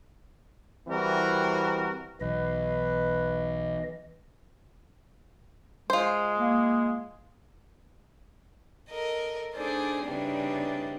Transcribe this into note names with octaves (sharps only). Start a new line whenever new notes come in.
E3 G3 C4 F#4 A#4
B1 E3 B4 D#5
G#3 F4 C5
A#3
A4 A#4 D#5
D4 D#4 G#4 A4 C5 D5
C#3 E3 G3 C4 D4 D#4